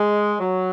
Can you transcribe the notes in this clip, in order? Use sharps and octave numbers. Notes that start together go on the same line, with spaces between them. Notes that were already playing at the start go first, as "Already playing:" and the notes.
Already playing: G#3
F#3